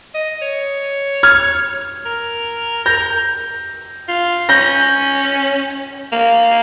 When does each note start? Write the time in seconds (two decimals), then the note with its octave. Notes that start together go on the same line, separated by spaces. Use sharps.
0.14 D#5
0.42 C#5
1.23 F6 G#6
2.05 A#4
2.86 G6 A#6
4.08 F4
4.49 C#4 G6 A#6
6.12 A#3